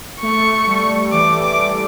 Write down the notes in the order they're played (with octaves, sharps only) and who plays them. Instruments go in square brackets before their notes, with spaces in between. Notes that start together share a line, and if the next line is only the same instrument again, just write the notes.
[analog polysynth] A3 [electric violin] C#6
[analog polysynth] G3
[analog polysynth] E3 [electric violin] D6
[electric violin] D6